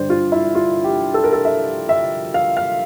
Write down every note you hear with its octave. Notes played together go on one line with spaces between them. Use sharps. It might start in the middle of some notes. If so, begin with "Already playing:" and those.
Already playing: G2 D3 G3 C5 D5
F4
E4
F4
G4
A4
A#4
A4
E5
E5
F5
F5